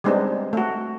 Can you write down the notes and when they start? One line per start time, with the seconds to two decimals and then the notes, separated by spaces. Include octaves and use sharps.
0.04 G3 G#3 B3 C4 D4 D#4
0.53 A3 F#4